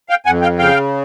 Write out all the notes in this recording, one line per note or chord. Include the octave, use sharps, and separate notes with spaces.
F5 G5
F2 F#5 G#5
F5 G5
C#3 F5 G5